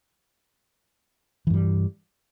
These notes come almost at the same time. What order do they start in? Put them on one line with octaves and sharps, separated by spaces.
E3 G2 G3